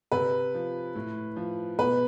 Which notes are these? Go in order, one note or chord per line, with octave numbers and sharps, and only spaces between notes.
C3 B4
F3
A2
F3
B2 B4